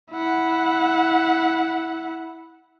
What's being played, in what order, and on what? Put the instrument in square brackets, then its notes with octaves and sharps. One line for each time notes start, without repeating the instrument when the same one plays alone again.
[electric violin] E4 F#5